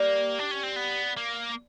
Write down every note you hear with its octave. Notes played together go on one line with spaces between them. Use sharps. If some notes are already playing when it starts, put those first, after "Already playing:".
Already playing: G3 A#3
D4
C#4
C4
B3
A#3